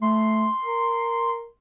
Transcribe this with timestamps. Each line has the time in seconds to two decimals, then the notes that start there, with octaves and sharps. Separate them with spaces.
0.02 A3 C6
0.64 A#4